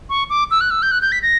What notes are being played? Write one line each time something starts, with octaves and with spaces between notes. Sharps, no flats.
C#6
D6
E6
F#6
E6
G6
F#6
G6
B6
A#6